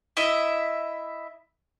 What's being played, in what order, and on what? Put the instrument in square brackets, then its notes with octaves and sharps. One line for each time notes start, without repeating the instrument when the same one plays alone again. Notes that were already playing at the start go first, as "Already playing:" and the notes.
[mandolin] E4 D#5 E5